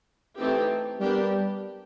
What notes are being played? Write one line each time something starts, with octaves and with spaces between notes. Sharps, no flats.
E3 A3 C4 D#4 G4
G3 B3 D4 G4 A#4